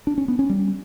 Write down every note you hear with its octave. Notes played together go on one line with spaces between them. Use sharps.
D4
C#4
B3
C#4
G3